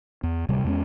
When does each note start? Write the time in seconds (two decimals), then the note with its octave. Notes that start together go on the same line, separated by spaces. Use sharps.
0.23 E2
0.49 D1 C3 G3
0.64 E2 G#3 C#4